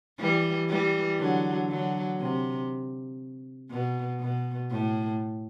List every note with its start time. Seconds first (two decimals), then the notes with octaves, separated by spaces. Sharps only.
0.19 E3 G3
0.69 E3 G3
1.19 D3 F#3
1.69 D3 F#3
2.20 C3
3.71 B2
4.20 B2
4.71 A2